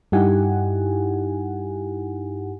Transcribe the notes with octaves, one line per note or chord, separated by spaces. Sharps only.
G2 D#4 E4 G4 F#5 G#5